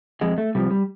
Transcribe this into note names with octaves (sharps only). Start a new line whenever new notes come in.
F2 G#3
A3
C3 F3 G3
G3